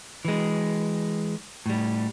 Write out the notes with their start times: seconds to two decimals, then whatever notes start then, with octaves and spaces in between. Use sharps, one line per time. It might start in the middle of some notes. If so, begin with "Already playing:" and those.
0.25 E3 G#3
1.66 A2 G3